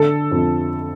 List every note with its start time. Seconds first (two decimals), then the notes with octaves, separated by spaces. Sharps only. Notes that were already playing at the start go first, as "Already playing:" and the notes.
Already playing: D3 A4
0.31 F2